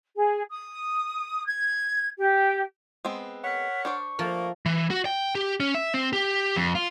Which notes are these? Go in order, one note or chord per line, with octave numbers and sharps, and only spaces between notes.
G#4
D#6
G#6
G4
G#3 B3 C4
A#4 C#5 F#5 B6
D4 C5 D5 C#6
F3 A3 A#3 A#4
E3
F#4
G5
G4
C#4
E5
C4
G4
F2
F4